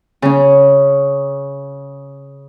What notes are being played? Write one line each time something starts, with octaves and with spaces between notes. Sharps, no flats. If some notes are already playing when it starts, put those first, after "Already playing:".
C#3 C#4